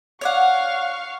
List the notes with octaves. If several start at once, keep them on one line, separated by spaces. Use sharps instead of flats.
C#5 D5 F5 F#5 C#6